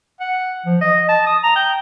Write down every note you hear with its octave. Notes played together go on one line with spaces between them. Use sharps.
F#5
F3
D#5
A5
D#6
A#5
G5